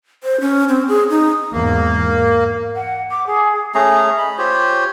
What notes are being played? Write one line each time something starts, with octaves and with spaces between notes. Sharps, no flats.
C5
C#4
C4
G#4
D#4
E2 G#2 A#3
F#5
D6
G#4
A3 C#4 G#4 A#5
D#5 B5
F4 G4 C5 C#5